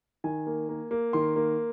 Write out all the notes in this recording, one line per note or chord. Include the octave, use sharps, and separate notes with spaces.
D#3 G#5
A#3
A#3
A#3
D#3 C6
A#3